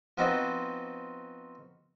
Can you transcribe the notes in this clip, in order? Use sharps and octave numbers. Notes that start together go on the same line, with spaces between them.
F3 B3 C4 D#4 F#4